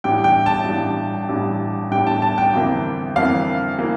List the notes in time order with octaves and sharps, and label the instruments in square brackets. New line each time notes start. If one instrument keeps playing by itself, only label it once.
[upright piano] A1 G2 E3 G5
G5
A5
A1 G2 E3
A1 G2 E3
A1 G2 E3 G5
A5
A5
G5
G1 F2 E3 A#3
G1 F2 E3 A#3 F5
E3 A#3